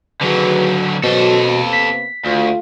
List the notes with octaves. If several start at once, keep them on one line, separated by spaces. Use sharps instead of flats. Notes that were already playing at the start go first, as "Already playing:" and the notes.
D3 D#3 F#3 G#4 B4
G#2 B2 F#3 A4 C5
C3 A#3 B3
B6
D2 A3 F4